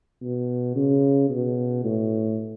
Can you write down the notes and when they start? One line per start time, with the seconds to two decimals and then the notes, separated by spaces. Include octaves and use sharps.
0.22 B2
0.75 C#3
1.30 B2
1.84 A2